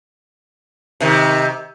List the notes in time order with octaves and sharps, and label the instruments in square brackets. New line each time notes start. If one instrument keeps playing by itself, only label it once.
[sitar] C3 D#3